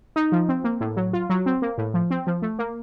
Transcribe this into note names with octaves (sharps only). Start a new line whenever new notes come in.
D#4
F3
C4
A#3
A2
F#3
F4
F#3
C4
A#3
A2
F3
C4
F3
A3
A#3